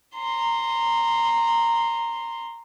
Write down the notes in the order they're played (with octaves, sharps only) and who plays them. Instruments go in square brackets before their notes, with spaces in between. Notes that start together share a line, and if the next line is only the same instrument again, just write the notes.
[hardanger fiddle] A#5 C6